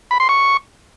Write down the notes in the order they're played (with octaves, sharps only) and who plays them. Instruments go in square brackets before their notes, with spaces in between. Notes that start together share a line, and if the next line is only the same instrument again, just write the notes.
[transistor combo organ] B5
C6
C#6